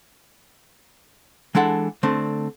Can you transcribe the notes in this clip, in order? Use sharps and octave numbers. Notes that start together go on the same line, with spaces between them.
E3 G#3 D4 A4 F#5
D3 A3 C4 D4